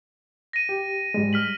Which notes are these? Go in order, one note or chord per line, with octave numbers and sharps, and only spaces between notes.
A#6 D#7
G4
G#2 G3 G#3
F6 B6 F#7